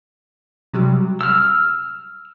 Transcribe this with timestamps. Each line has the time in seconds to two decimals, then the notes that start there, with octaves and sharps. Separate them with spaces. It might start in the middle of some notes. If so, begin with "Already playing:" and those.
0.73 C3 F#3 G3
1.21 E6 F6